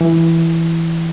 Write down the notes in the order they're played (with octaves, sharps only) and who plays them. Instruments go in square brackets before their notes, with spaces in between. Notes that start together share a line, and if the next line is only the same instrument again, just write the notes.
[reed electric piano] E3